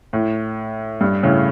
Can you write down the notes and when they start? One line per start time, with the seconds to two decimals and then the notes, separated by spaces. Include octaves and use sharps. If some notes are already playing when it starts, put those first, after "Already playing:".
0.13 A2
1.01 G2
1.23 A2 C#3